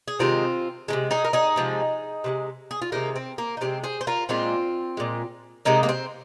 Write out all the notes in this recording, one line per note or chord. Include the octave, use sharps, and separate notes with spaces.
G#4
C3 D#3 G#3 C4 F4
C3 D#3 G#3
D#4 G#4
A#4
D#4 G#4
C3 F3 G#3
C3 F3 G#3
G#4
F4
C3 D#3 G#3 A#3 D#4
C4
A#3
D#4
C3 D#3 G#3 C4
G#4 C5
C5
F4 A#4
A#2 G#3 C4 F4
A#2 G#3
C3 G#3 A#3 D#4
A#3
C4